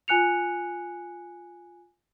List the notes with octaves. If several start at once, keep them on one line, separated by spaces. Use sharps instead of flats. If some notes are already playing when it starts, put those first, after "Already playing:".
F4 G#5 F#6 C#7 F7